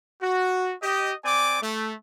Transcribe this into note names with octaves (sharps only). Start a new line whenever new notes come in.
F#4
G4 D#5
C4 D5 G#5 D6
A3